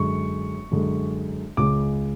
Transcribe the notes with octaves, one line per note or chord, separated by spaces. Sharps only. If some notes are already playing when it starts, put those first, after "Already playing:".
Already playing: F#2 D3 G#3 C#6
F#2 D3 G#3
C#2 C#3 G#3 D6